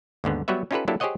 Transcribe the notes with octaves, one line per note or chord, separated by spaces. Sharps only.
D#2 G#2 D3 B3
F#3 G3 B3 F#4 B4 E5
C#4 D#4 F4 G4 A4 B4
F#3 A#3 D4 E4 G4 A4
G4 G#4 C5 C#5 D#5 F#5